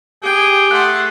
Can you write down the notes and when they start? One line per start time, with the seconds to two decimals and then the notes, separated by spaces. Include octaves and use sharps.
0.23 G4 G#4 G5
0.71 A3 F#5 C6 F#6